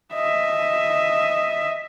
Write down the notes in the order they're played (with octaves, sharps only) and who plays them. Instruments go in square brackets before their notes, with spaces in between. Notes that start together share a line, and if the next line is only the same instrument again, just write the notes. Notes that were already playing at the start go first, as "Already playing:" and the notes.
[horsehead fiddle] D#5 E5